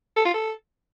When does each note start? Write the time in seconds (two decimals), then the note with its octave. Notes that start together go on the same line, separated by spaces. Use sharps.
0.17 A4
0.25 F4
0.34 A4